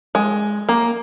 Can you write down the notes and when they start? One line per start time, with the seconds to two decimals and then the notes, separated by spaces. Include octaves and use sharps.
0.15 G#3
0.69 A#3